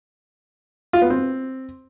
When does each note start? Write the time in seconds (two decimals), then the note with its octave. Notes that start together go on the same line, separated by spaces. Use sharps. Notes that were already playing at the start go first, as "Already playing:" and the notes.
0.93 F4
1.02 B3
1.10 C4